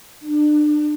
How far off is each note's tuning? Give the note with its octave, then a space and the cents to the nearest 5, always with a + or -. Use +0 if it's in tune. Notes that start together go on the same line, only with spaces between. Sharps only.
D4 +30